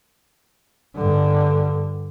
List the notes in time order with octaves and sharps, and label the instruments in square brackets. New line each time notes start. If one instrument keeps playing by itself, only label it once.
[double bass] G2 D3